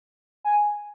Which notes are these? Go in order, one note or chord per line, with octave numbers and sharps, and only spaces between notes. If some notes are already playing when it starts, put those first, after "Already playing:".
G#5